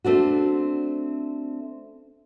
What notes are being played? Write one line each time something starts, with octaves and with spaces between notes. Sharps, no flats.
A3 C4 D4 F#4